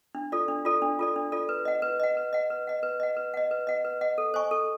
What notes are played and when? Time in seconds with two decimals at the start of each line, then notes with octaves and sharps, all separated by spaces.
0.15 D4
0.32 F4 A4 D5
0.48 D4
0.65 F4 A4 D5
0.82 D4
0.99 F4 A4 D5
1.16 D4
1.32 F4 A4 D5
1.49 B4
1.65 D#5 F#5
1.82 B4
2.00 D#5 F#5
2.17 B4
2.33 D#5 F#5
2.50 B4
2.67 D#5 F#5
2.83 B4
3.00 D#5 F#5
3.17 B4
3.34 D#5 F#5
3.51 B4
3.67 D#5 F#5
3.85 B4
4.01 D#5 F#5
4.18 A4
4.34 C5 D#5 G#5 C#6
4.51 A4